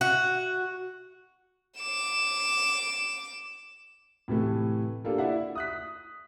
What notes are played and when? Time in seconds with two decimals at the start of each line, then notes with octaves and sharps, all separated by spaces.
0.01 F#4
1.78 D6 E7
4.28 A2 C3 E3 A3
5.04 G3 A#3 D4 F4 A4
5.18 E4 D5 E5 F#5
5.55 D#6 F#6 B6